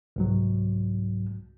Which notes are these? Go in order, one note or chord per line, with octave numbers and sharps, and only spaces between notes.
C2 G#2 F#3